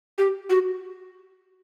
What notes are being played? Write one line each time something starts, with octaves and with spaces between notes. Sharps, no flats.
G4
F#4